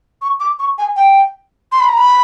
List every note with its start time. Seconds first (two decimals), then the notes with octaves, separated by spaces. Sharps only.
0.22 C#6
0.40 D6
0.59 C#6
0.78 G#5
0.96 G5
1.72 C6
1.80 B5
1.89 A#5
1.97 B5